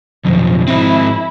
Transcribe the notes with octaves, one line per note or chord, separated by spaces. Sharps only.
B1 F2 F3
G#2 C4 E4